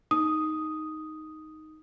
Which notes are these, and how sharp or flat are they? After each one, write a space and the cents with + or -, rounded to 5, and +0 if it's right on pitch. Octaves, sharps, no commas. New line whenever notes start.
D#4 +0 D#6 +0